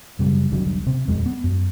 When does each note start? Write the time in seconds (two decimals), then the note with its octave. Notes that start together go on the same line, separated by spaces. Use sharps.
0.19 F#2 C#3 G3
0.50 F1 C2 D3 F#3
0.86 C3 C4
1.08 D#1 F2 G#3
1.26 B3
1.44 F#2